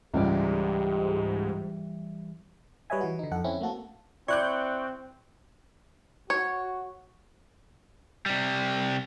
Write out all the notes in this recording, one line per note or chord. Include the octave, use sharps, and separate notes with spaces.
C#2 G#2 E3 G3 G4 D5
G3 B4 C#5 D#5 E5 G#5
E3 F#4
D3 D#4
F2 A4 F#5
C4 C#4 E4
A3 A#3 F#4 A4
C4 E4 D5 C#6 D6 F#6 G6
F#4 C#5
C3 G3